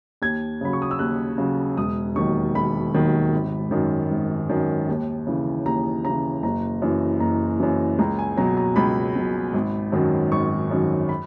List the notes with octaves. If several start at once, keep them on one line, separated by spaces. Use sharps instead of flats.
D#2 G#6
C#3 F#3 B5
C#6
D#6
E6
D#2 F#6
C#3 F#3
E1 D#6
D#2 D#3 F#3 C#6
E1 B5
D#2 D#3 F#3
G#1
F#2 D#3
G#1
F#2 D#3
D#2
C#3 E3
D#2 A#5
C#3 E3 A#5
F#1 A#5
F#2 E3
F#1 A#5
F#2 E3
C#2 A#5
G#5
B2 F#3 A#5
A#5
C#2 B5
B2 F#3
G#1
F#2 D#3 F#3
G#1 C#6
F#2 D#3 F#3
B5